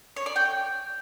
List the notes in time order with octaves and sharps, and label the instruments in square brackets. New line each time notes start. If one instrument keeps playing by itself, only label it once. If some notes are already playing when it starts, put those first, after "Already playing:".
[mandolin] C#5
D5
G5